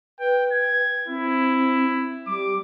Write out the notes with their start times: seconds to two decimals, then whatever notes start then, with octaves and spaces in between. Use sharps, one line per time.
0.20 B4 G5
0.52 G#6
1.08 C4 E4
2.27 G3 D6